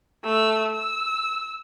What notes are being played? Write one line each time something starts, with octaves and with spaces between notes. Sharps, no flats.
A3 E6
E6